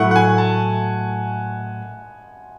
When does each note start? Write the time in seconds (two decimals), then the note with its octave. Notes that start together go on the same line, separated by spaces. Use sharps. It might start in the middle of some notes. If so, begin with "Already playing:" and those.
Already playing: A2 F#3 A3 E4 A4 F#5
0.11 F#5
0.16 G#5
0.38 A5